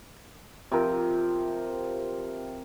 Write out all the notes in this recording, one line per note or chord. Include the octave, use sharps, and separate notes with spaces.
C3 F3 A#4